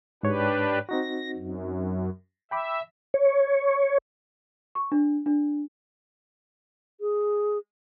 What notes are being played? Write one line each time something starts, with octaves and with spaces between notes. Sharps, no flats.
G#2 D4 G4 B4 C#5
C4 D#4 F#4 A#6
F#2
E5 G5 B5 D6
C#5
C#6
D4
D4
G#4